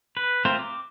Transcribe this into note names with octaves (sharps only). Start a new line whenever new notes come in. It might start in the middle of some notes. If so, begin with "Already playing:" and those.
B4
A3 C4 F4 A#4 C5
D6